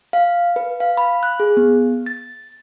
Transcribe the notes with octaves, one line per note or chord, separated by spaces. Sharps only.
F5
B4
F5
B5
F#6
G#4
B3
A6